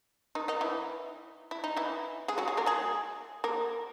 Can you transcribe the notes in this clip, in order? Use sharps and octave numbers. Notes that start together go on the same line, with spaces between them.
D#3 D#4
D#3 D#4
E3 E4
E4
D#4
E3 E4
G#3 G#4
F#3 F#4
G#3 G#4
A#3 A#4
G#3 G#4
A#3 A#4